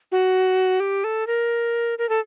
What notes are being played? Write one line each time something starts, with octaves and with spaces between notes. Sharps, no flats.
F#4
G4
A4
A#4
A#4
A4